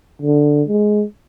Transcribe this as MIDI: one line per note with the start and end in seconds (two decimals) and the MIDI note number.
0.22 0.63 50
0.68 1.05 56